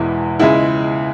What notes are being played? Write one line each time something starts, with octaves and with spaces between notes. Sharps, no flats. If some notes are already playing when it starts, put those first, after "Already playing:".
Already playing: E1 E2 E3 G#3 E4
C#2 C#3 G#3 E4